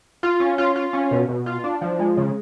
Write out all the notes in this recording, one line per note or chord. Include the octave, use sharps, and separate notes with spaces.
F4
C#4
F4
F4
C#4
B2
B2
F4
D4
F3
G#3
C#3